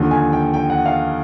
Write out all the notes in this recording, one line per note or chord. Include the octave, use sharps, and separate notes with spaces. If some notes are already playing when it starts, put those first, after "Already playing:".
Already playing: D#2 D3 F3
G#5
G5
G5
F#5
F5